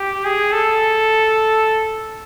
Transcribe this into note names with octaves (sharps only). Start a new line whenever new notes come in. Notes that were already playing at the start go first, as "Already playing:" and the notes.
Already playing: G4
G#4
A4